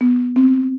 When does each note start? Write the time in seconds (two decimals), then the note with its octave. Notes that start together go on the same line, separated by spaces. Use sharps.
0.01 B3
0.36 C4